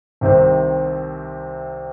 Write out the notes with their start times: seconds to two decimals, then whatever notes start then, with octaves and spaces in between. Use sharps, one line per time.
0.21 C2 C3 D#3 C4